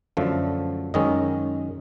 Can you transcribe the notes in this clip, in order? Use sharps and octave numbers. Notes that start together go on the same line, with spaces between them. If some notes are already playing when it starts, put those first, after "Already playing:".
F#2 D3 F3 A3
F#2 D#3 G#3 C#4 D#5